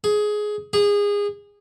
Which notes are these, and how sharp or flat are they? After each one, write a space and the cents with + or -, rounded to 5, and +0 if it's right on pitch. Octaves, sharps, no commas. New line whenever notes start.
G#4 +15
G#4 -25